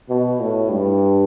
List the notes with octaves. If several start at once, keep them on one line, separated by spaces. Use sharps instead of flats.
B2
A2
G2